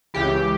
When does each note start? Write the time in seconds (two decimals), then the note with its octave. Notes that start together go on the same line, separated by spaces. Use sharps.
0.14 C#2 C#3 E3 G4